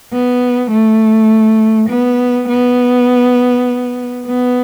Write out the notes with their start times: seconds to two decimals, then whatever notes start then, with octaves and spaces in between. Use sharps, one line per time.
0.12 B3
0.71 A3
1.89 B3
2.48 B3
4.26 B3